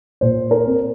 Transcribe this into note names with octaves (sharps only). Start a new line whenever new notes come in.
A#2 C5
A#4
C4